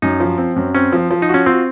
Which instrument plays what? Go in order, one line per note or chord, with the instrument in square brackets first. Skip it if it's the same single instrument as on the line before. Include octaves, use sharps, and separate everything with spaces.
[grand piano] F#2 [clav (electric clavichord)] D#4
[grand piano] F3
C4
F#2
[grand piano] C4 [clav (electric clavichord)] C#4
[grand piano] F3
F3
[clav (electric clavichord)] D#4
[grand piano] F#4
[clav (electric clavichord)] C#4
[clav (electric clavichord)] C4 [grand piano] F4